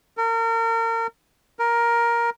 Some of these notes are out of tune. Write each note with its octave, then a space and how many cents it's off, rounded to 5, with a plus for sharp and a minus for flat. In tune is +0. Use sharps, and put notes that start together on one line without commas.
A#4 -35
A#4 +10